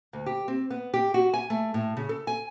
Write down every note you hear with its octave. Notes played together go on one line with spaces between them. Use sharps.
D2
G4
C4
B3
G4
F#4
G#5
A3
A2
C#3
A4
G#5